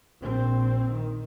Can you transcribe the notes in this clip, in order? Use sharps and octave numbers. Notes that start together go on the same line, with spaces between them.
A#1 C4
D#3